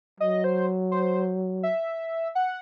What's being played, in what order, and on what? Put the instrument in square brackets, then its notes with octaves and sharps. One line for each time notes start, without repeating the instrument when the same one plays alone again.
[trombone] F#3 [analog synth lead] D#5
[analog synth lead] C5
C5
E5
F#5